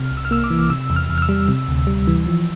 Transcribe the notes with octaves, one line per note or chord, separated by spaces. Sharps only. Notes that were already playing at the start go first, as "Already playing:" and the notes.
Already playing: C3 F6
C2
E6
F6
A#3 E6
D6
E3
C3 E6
E2
F6
E2
F6
E6
G3
C3
D2
G3
E3
F3